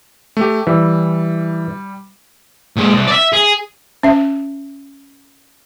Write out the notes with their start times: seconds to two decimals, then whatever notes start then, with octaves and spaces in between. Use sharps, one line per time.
0.37 A3 G4
0.67 E3 G3
2.77 A#2 G#3
2.92 C2
3.07 D5 E5
3.33 G#4
4.03 C#4 E5